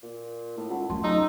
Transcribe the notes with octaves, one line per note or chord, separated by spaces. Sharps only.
A#2
A2
C#2 F4 F#5 A5
F#2 F#3 A3 A5 C6
C#3 D#4 A#5 C6 E6